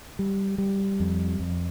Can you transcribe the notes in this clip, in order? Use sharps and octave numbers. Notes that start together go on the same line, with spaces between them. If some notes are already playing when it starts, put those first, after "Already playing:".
G3
G3
F2
F2